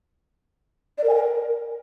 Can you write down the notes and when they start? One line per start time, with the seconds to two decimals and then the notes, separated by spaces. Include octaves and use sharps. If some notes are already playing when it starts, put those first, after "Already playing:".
0.98 D5
1.03 A#4
1.09 G#5
1.14 A#4